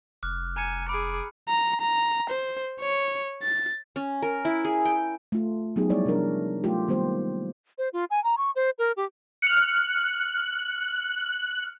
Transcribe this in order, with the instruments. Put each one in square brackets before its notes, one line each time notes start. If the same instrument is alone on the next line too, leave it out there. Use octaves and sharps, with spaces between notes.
[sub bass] F1 [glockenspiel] D6 F6 F#6
[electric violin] G#5 [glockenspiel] A#5 C#7
[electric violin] G#4 D6 [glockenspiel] B5 D7
[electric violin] A#5
A#5
C5
C#5
A6
[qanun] C#4
A#4
E4
G#4
G5
[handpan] A3 F4
F#3 B3 D#4 G4 G#4
F3 G3 B3 E4 C#5 D5
C3 F3 F#3 D4 A#4
F#3 A3 F4 G4
D#3 G3 A#3 B3 G4 C5
[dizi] C5
F4
G#5
A#5
C#6
C5
A#4
G4
[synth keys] F6 C#7 [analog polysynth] F#6